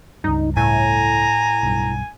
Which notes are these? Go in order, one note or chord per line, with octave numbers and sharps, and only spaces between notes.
C#2 G2 D#4
A2 G#5 A#5
B1 G2